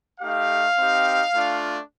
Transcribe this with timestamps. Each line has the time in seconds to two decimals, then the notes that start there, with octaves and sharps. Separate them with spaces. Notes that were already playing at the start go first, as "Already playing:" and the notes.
0.20 A3 D#4 G4 F5
0.77 C4 D#4 G4
1.34 A3 D4 F4